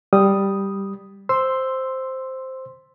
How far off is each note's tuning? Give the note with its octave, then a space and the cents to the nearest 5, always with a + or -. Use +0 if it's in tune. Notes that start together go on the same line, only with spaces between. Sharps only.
G3 +0 D#6 +0
C5 +0 C6 +0 E6 +0